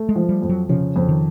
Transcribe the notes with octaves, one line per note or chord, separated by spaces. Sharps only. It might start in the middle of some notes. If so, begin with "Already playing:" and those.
Already playing: A3
G#3
F3
G3
F2
F#3
C#3 F3
F2
D#3